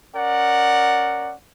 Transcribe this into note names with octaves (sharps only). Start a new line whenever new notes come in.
C#4 A#4 D5 F#5